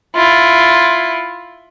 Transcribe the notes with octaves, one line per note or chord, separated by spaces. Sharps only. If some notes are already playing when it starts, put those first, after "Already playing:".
E4 F4